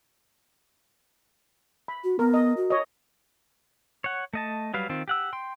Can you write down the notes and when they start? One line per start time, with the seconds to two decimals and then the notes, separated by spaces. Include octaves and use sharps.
1.88 B5
2.04 F#4
2.19 B3 A#4
2.34 D#5
2.57 F#4
2.70 C#5 D#5
4.04 C#5 F#5
4.33 A3 D#5 A5
4.74 F#3 G3 B4 F5
4.89 D#3 C4 F4
5.08 G4 F#5 E6
5.33 G5 C6